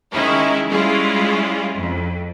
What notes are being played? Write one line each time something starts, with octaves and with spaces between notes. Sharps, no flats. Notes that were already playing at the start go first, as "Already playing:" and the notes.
D#3 G#3 C#4 D#4 E4
G3 G#3 C#4 E4 F4
F2